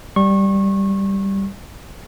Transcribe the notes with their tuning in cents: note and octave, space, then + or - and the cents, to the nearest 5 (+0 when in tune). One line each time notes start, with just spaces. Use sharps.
G3 +0 C#6 -30